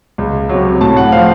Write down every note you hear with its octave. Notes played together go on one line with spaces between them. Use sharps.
C#2
C3 F#3
A2 A5
F#5
F3 C4 F5